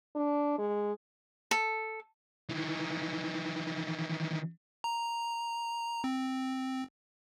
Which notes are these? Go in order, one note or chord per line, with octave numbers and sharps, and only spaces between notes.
D4
G#3
A4
D#3 E3
A#5
C4